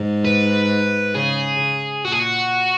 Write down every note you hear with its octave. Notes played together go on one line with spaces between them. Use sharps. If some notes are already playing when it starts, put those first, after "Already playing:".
Already playing: G#2
B4
C#3 G#4
A#2 F#4
G#4
F#4